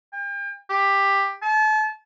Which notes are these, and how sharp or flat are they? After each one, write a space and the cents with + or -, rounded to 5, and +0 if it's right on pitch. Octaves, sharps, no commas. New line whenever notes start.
G5 +40
G4 +10
A5 -35